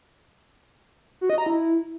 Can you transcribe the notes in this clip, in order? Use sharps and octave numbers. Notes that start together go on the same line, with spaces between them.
F#4
D#5
A#5
E4